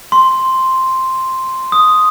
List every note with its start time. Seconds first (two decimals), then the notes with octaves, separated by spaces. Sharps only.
0.12 C6
1.72 D#6